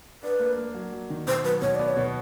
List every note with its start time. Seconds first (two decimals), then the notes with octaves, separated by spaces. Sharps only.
0.23 D4 B4
0.39 A#3
0.57 A#3
0.74 F#3
0.93 F#3
1.10 D#3
1.27 B2 C5
1.44 F#3 B4
1.62 B2 C#5
1.75 B3 D5
1.88 C#5
1.97 B2